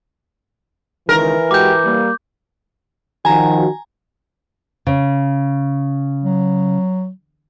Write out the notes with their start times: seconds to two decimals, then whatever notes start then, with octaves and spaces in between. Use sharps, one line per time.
1.09 C#2 D#3 E3 A#4
1.51 G#3 F#4 G4 D6 G6
1.85 G3 A#3
3.25 D#3 F3 F#4 G#5 A#5
4.87 C#3
6.23 F#3